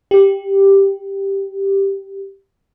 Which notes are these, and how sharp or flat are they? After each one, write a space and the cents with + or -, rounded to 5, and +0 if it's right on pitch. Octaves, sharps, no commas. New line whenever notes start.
G4 +0